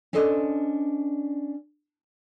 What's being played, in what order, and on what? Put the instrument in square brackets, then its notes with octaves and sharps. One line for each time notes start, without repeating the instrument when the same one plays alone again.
[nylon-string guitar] C#4 D4 A4 C5 D#5